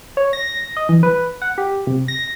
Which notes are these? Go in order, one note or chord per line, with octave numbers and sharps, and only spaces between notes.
C#5
A#6
D#5
E3
B4
F#5
G4
C3
A#6